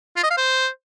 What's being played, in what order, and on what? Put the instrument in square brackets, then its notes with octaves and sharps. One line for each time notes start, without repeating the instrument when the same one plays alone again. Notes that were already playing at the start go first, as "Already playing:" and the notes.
[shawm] F4
D#5
F5
C5